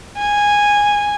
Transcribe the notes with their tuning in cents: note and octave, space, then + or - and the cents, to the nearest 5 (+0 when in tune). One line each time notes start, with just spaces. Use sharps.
G#5 -10